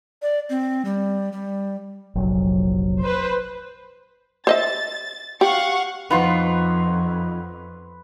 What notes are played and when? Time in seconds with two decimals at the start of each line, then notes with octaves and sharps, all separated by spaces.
0.22 D5
0.50 C4
0.85 G3
1.32 G3
2.15 F1 A#1 F#3
3.03 B4 C5
4.47 C5 D#5 E5 A6
5.41 G4 F5 F#5 C#6
6.10 F2 F3 B3 D#4 F4 B4 C6 C#6